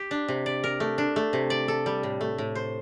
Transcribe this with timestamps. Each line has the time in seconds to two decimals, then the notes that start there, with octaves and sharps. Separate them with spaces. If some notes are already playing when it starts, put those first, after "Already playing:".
Already playing: G4
0.11 D4
0.28 C3
0.46 D5
0.64 A#4
0.80 A3
0.98 D4
1.16 A3
1.33 C3
1.50 D5
1.68 A4
1.86 G3
2.03 A2
2.21 A3
2.38 A2
2.55 C5